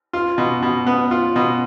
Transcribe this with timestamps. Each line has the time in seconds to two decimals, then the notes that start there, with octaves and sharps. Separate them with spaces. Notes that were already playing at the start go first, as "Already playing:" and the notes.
0.13 F4
0.38 B2
0.62 B2
0.87 B3
1.11 F4
1.36 B2